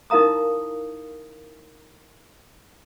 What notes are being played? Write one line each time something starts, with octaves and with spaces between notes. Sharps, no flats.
D#4 E4 A#4 F5 A#5 D#6